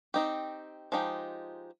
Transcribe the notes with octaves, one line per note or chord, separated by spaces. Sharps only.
C4 D#4 G4
F3 G#3 D#4 G4